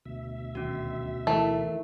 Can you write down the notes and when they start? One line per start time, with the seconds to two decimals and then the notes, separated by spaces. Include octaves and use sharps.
0.05 D2 B2 E5
0.55 D#1 C#4 F#4
1.27 E3 A3 D#4 E4 A#4